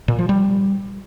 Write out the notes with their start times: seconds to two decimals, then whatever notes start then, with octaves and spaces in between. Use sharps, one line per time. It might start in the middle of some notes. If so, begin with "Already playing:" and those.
0.08 A#2
0.19 F3
0.29 G3